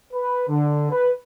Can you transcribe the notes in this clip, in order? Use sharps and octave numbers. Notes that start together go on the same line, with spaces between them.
B4
D3
B4